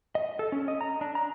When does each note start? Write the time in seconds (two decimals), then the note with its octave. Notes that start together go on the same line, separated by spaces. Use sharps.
0.15 D#5
0.39 A4
0.52 C#4
0.68 D#5
0.81 A#5
1.01 D4
1.15 A#5